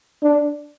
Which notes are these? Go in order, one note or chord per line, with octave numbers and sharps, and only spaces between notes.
D4